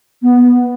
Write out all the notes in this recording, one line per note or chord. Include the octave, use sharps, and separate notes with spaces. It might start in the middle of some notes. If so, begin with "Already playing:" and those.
B3